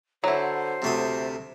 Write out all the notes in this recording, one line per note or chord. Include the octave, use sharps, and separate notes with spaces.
D3 F#3 E4 C5
D2 C3 A3 D#6